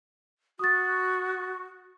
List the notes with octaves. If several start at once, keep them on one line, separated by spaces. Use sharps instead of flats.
F#4 D#6 A6